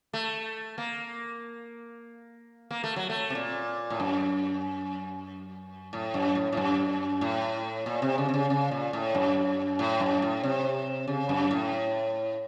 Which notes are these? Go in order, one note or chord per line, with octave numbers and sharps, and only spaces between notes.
A3
A#3
A#3
A3
F#3
A3
C3
A#2
A2
F#2
A2
F#2
A2
A2
F#2
A2
A#2
C3
C#3
C3
C#3
C#3
A#2
A2
F#2
A2
F#2
A2
C3
C#3
F#2
A2